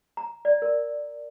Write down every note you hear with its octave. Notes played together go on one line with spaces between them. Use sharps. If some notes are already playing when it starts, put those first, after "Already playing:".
A#5
D5
A#4